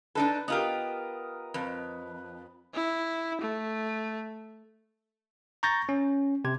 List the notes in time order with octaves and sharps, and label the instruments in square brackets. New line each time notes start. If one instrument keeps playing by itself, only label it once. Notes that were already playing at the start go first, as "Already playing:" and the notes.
[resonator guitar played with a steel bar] D4 D#4 A4 [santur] B4
[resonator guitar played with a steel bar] B3 F4 G4 [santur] A#4 D#5
[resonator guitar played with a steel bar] F2 [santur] B4
[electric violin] E4
A3
[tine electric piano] A#5 C#6 G6 A6 A#6
C#4
C3 G#6